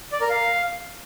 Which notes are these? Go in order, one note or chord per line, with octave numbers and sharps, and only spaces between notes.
D5
A#4
F5